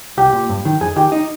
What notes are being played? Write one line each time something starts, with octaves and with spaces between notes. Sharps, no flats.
C2 G4
A#2
G2
D#3
F2 G#4
D#3 G4
D#4